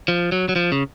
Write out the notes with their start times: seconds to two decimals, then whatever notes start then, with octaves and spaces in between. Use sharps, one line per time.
0.08 F3
0.32 F#3
0.49 F#3
0.56 F3
0.72 C#3